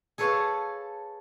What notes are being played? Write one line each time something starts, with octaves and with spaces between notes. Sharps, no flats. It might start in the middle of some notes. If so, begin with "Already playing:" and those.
G#4 A4 B4 C#5 F5 A5